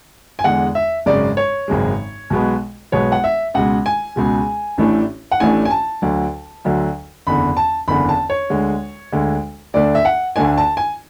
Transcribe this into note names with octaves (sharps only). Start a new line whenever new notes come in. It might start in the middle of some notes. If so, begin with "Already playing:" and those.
G#5
E2 D3 G#3 F#5
E5
G#1 F#2 C#3 G#3 D5
C#5
G#1 F#2 C#3 G#3
B1 B2 G#3 B3
B1 B2 G#3 B3 C#5
F#5
E5
C#2 B2 G#3 F#5
G#5
C#2 B2 G#3
A1 A2 E3 A3 D4
F#5
A1 A2 E3 A3 D4 G#5
G#5
A5
D2 D3 F#3
D2 D3 F#3
F#1 E2 D3 B5
A5
F#1 E2 D3 B5
A5
C#5
D2 D3 G#3
D2 D3 G#3
D2 D3 A3 D4 D5
E5
F#5
D2 D3 A3 D4 G#5
A5
G#5